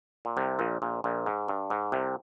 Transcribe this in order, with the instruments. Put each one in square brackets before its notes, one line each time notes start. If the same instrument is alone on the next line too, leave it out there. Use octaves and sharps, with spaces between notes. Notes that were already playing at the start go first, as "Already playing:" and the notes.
[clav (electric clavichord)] A#2
C2 C3
A#1 A#2
A#1 A#2
A#1 A#2
G#2
G2
G#2
C2 C3